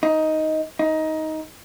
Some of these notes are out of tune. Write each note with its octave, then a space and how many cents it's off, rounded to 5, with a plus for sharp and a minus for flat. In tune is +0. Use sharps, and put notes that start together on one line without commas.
D#4 +10
D#4 +15